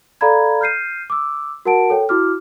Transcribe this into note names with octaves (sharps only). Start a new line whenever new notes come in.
A4 D5 F5 A#5 B5 G#6
F6 G6 C7 D#7
D6 E6
F#4 A#4 F#5 A5 D7
A4 C#5 G5
E4 F#4 D6 F6